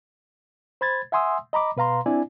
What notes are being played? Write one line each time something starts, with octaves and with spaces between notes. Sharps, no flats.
C5 B5 G#6 A6
E5 F#5 G#5 C6 D#6 E6
D#5 A#5 B5 D6
B2 B4 F5 A#5 C6
C4 D4 E4 D5 G#5